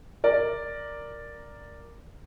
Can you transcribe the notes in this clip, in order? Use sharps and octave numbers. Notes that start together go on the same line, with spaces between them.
A#4 D5